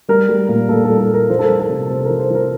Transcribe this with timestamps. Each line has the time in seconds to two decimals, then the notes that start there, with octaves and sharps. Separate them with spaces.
0.09 G3 A#4
0.29 G3
0.49 A#2
0.69 A#2 A4
0.84 A4
0.90 G3
1.00 A4
1.09 G3 A#4
1.30 F3 C5
1.39 A4
1.45 F3 A#4
1.59 A4
1.69 C3
1.89 C3 C5
2.05 F3 A#4
2.19 C5
2.30 F3 A#4